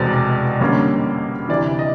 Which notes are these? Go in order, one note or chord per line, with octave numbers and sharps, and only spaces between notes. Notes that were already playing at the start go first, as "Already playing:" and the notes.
Already playing: F1 E2 B2 G#3 C4 D5
F2 D3 G3 A#3 C#4
D2 C3 E3 D5
D#5